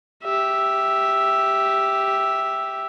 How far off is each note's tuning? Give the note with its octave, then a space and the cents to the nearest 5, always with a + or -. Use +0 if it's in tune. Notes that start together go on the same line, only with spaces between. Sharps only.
G4 +0 E5 +0